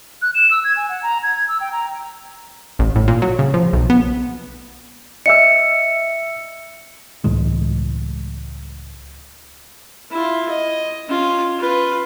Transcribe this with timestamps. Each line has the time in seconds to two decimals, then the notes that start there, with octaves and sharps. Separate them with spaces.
0.22 F#6
0.34 E7
0.51 E6
0.64 G#6
0.77 G#5
0.89 F#5
1.03 A#5
1.23 G#6
1.35 G#6
1.48 E6
1.60 G5
1.72 A#5
2.79 A1
2.96 A2
3.08 A#2
3.22 F#3
3.39 C#3
3.54 F3
3.73 B1
3.90 B3
5.26 D#5 E5 E6 C#7
7.24 C#2 A2 E3 G#3
10.11 E4 F4
10.49 D#5
11.07 C#4 F4
11.59 F4 B4